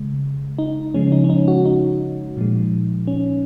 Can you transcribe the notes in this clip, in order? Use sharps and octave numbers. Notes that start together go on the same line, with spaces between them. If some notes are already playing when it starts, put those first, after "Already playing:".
Already playing: C#3 G#3
D#4
C#3 F3 G#3 C#4
D#4
C#4
D#4
F#4
D#4
A#2 F3 G#3
C#4